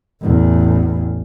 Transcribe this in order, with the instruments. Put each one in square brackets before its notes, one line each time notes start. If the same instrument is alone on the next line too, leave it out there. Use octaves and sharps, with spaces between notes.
[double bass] A1 E2